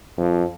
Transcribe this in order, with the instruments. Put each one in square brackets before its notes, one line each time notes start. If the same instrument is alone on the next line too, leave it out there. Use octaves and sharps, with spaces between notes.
[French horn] F2